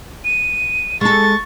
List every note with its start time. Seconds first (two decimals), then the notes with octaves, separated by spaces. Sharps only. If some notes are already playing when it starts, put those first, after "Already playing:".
0.24 D#7
1.01 G#3 A4 C#6 A6